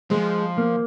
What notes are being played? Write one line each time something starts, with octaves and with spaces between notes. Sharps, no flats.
F3 G#3
A#3